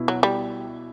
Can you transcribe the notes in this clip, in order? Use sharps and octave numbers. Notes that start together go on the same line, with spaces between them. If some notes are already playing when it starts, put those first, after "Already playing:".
Already playing: B2 E4
F#3
G3